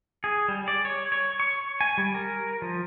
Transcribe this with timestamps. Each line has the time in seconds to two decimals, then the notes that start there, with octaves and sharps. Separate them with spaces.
0.24 G#4
0.48 G3
0.68 D5
0.85 C#5
1.12 C#5
1.40 C#6
1.81 G#5
1.98 G3
2.14 A#4
2.62 F3